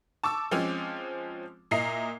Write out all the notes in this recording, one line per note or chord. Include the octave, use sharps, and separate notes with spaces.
A5 C#6 D6 E6
F3 G#3 C4 C#4 D6
A#2 E4 D#5 A#5 C7